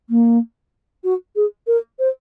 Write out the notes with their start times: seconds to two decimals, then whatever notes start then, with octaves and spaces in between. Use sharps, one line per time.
0.10 A#3
1.04 F#4
1.36 G#4
1.67 A#4
1.99 C5